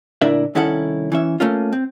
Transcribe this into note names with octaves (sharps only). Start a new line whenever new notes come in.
D2 A#2 D4 E4 A#4 E5
C2 D#3 C#4 E4 A4 F#5
E3 C#4 E5
A3 A#3 C#4 F4
C4